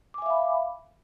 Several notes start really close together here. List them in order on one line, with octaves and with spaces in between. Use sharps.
D6 G#5 E5 F5 B5